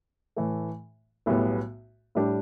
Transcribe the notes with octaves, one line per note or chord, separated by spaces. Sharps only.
A2 E3 A3
B1 A2 G3 B3
A2 G3 D4 G4